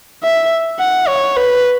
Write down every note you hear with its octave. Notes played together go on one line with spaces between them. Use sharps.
E5
F#5
C#5
B4